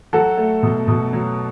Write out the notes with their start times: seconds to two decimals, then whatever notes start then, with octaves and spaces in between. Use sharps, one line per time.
0.13 F#3 F#4 A4
0.37 A3
0.63 B2
0.88 B2
1.13 F#3